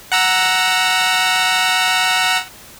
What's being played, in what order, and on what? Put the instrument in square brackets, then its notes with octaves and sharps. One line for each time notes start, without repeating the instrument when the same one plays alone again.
[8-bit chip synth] F#5 A#5 E6